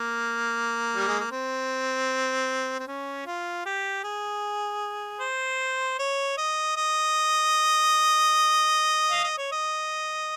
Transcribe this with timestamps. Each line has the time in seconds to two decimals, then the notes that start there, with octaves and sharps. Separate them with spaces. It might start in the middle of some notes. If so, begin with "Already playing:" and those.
Already playing: A#3
0.96 G3
1.08 G#3
1.20 A#3
1.32 C4
2.80 C4
2.88 C#4
3.26 F4
3.66 G4
4.04 G#4
5.21 C5
5.99 C#5
6.38 D#5
6.77 D#5
9.10 F5
9.24 D#5
9.38 C#5
9.52 D#5